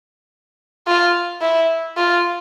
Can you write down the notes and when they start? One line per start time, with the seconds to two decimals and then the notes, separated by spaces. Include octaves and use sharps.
0.87 F4
1.41 E4
1.97 F4